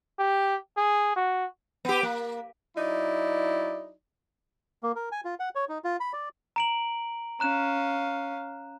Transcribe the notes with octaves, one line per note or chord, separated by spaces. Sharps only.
G4
G#4
F#4
B3 G4
A#3
F#3 D#4 E4 D5
A#3
A#4
G#5
F4
F#5
C#5
D#4
F4
B5
D5
A#5 D7 F#7
C#4 F5 A#5 F#6 E7